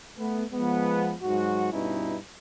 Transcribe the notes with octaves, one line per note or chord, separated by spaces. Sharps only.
A3 B3
F3 G#3 B3
G#2 F#3 F#4
G2 B2 C#4 D#4 E4